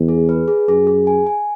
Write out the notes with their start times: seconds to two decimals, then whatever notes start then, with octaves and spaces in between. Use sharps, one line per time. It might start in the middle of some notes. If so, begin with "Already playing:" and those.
Already playing: E2
0.09 G#4
0.29 B4
0.48 G#4
0.68 F#2 G#4
0.87 G#4
1.07 G#5
1.27 G#5